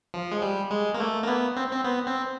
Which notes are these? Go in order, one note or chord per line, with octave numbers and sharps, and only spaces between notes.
F3
G#3
G3
G#3
A#3
A3
A#3
B3
C4
C4
B3
C4